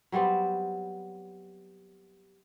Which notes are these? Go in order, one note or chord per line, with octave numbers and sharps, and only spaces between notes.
F#3 G3 B3 C4